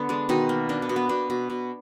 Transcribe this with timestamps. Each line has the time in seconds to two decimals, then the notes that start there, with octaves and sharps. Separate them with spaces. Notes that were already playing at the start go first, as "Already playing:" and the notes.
Already playing: D3 B3
0.09 G#3 D4
0.29 B2 D#3 D#4
0.49 A#3
0.69 A#3 D4
0.82 B3
0.89 B2
0.96 B3
1.09 B2 D4
1.30 B2
1.50 B2